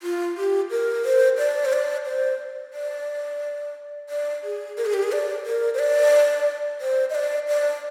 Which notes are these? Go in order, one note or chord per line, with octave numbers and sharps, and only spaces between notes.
F4
G4
A#4
C5
D5
C5
D5
C5
D5
D5
G#4
A#4
G#4
G4
G#4
D5
A#4
C5
D5
C5
D#5
D5
D5